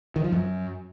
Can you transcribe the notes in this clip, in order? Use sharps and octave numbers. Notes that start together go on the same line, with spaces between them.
D#3
F3
F#2